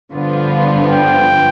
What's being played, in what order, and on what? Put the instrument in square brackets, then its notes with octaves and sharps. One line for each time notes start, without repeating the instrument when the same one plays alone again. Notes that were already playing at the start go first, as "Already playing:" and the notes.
[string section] G2 D3 F3 B3 F4
[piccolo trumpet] G5